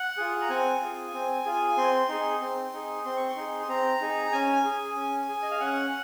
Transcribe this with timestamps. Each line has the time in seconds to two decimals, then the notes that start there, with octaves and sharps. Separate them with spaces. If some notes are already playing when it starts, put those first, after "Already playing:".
Already playing: F#5
0.17 F4 G#4
0.41 A#5
0.49 C4 G#5
0.81 F4 G#4
1.13 C4
1.45 F4 G#4
1.77 C4 C6
2.09 D#4 G#4
2.41 C4
2.73 D#4 G#4
3.05 C4 C6
3.17 C#6
3.28 C6
3.36 D#4 G#4
3.62 C6
3.68 C4 A#5
4.01 D#4 G#4
4.32 C#4 G#5
4.64 G#4
4.96 C#4
5.28 G#4
5.42 D#5
5.51 F5
5.60 C#4 F#5